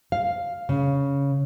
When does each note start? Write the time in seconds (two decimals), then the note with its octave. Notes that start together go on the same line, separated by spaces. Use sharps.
0.12 F5
0.69 C#3